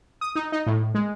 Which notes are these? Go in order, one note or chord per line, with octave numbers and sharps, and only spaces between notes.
D#6
D#4
D#4
A2
G#3